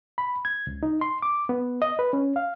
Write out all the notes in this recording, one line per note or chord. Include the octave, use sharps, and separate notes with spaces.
B5
G#6
C#2
D#4
C6
D6
B3
D#5
B4
C#4
F5